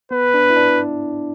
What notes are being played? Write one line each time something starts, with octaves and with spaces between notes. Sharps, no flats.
B3 B4
D4
E4
D4